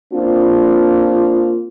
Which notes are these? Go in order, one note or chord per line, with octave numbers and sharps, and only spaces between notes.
A#3 C4 D4 F4